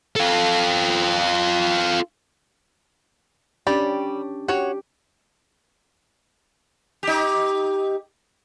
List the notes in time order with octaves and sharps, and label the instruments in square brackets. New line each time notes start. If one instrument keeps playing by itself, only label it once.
[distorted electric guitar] F4 A4
[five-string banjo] G3 D5 [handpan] C#4 D4 G4
[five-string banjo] F#4 C#5 [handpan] G4
[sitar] D#4 G4